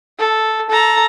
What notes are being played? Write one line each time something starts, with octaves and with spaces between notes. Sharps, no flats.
A4
A4 A#5